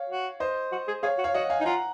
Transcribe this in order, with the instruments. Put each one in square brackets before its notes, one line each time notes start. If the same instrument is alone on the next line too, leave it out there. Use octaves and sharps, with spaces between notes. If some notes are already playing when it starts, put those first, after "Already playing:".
Already playing: [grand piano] C#5 F5
[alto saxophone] F#4
[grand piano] C5 D#5
[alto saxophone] F#4
G#4
[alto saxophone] G#4 [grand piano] C#5 F5
[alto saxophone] F#4
[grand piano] C#5 F5
[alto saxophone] F#4 [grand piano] D#5 F#5
[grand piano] F5 G#5
[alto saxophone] D#4
[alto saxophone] F4 [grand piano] F#5 A#5